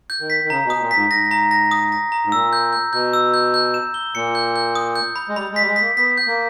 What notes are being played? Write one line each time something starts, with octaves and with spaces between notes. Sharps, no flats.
G6
D#3
B6
D#3
C#3 A#5
B2
D#6
B2
A#2
G#2 B6
G#2 A#6
A#5
A#6
D#6
A#6
A#5
G#2
A#2 E6
G6
G6
B2 G6
E6
G6
G6
E7
G7
A#2 C#7
G6
G6
D#6
G6
B5
G#3
G3 B5
G#3 B6
G3
G#3
A#3 B6
B3 B6
G6
A#3